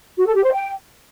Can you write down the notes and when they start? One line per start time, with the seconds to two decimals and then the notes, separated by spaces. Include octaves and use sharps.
0.18 F#4
0.26 A4
0.35 G4
0.43 C5
0.52 G5